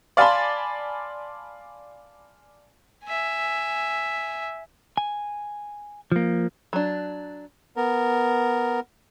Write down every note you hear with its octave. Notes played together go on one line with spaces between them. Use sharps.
D5 F5 G#5 A5 B5 C6
E5 G#5
G#5
F3 A#3
F#3 D4
B3 A#4